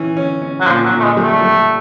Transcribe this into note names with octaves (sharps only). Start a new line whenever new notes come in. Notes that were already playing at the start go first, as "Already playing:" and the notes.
Already playing: E3 C#4
C#4
C#4
F#3
A#2 F3
F#3
A#2
A3
G#3
G3
A3
G3